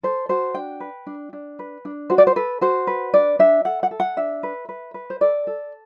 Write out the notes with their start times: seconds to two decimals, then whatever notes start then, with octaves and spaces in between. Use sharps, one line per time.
0.03 A4 C5
0.29 F#4 C5
0.55 D4 G5
0.80 B4
1.07 D4
1.33 D4
1.59 B4
1.85 D4
2.10 F#4 C5
2.18 D5
2.27 C5
2.36 A4 B4
2.61 F#4 C5
2.87 B4
3.14 D4 D5
3.39 D4 E5
3.65 A4 F#5
3.83 F#5
3.91 A4
4.00 F#5
4.17 D4 E5
4.43 B4
4.69 B4
4.94 B4
5.10 C5
5.21 A4 D5
5.47 A4